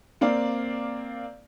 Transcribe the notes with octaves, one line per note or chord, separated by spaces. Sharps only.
A#3 C4 D5 F5